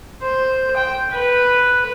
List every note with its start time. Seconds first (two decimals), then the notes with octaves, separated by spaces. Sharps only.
0.22 C5
0.76 G5
1.12 B4